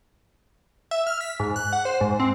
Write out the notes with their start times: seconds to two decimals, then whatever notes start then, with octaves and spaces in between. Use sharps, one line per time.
0.91 E5
1.07 F6
1.21 B6
1.40 G#2
1.56 F#6
1.73 F#5
1.85 C5
2.01 G#2
2.19 C4